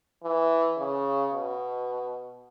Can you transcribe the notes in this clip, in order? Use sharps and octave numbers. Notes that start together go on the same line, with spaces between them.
E3
C#3
B2